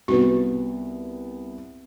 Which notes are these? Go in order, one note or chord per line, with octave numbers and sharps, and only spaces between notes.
C2 B3 F#4